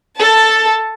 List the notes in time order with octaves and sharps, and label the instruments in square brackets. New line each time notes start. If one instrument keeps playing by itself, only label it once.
[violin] A4 A5